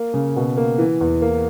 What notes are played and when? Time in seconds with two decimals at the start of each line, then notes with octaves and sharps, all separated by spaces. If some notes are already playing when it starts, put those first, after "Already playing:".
Already playing: A#3
0.14 C#3
0.36 B2
0.57 A#3
0.78 E3
1.01 E2
1.22 A#3